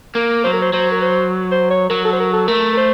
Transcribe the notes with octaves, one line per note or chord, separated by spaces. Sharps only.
A#3 A#4
F#3 C5
A#4
C5
F#3 C5
A#4
C5
C5
C#5
F#3 A#4
A4
C5
A#4
A4
A3 A#4
A#4
C5